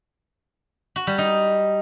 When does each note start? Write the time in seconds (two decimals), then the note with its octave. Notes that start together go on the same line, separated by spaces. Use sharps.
0.96 F#4
1.07 G3
1.18 D#4